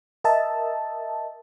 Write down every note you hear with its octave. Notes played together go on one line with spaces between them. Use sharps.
A#4 D#5 E5 A5